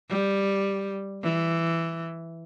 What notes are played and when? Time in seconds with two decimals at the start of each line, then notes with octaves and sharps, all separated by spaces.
0.10 G3
1.23 E3